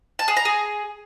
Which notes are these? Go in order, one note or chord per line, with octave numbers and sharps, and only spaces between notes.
A5
G#4
A#5
G#4